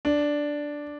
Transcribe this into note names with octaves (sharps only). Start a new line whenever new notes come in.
D4